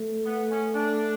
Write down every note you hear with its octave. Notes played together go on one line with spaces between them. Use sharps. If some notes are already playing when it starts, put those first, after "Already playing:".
Already playing: A3
B3
C#4
D4